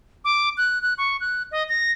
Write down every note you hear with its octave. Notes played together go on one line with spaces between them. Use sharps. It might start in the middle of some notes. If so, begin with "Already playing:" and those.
D6
F#6
F#6
C#6
F#6
D#5
A#6